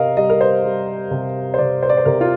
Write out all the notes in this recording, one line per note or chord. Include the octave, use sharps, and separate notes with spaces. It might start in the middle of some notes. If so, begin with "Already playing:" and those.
Already playing: C3 A#4 D#5 F5
G3 D#5
A#4
C5
G3
C3
C5
C3 D5
C5
D5
C5
C3 A#4
F4